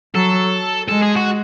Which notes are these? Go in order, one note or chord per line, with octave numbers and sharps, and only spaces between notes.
F#3 A4
G#3 A4
G#4
F#4